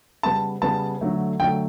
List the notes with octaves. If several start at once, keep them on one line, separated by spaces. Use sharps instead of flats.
C#3 G3 B3 A5
C#3 G3 B3 A5
D3 F#3 A3
D3 F#3 A3 G5